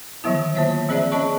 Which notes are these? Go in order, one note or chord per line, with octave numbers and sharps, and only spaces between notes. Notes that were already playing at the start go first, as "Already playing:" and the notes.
D3 D#3 F3 F#3 B3 E4
A#3 F4 C5 C#5 E5
F3 C4 G#4 C5 D5 E5
C#4 G#4 C#5 D#5 A5 C#6